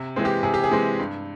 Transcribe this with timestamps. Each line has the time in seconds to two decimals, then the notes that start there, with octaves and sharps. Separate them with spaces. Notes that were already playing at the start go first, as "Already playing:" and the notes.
Already playing: C3
0.16 E3 G#3 C4
0.25 G4
0.43 C3 G#4
0.54 G4
0.64 G#4
0.71 E3 G#3 C4
0.99 G2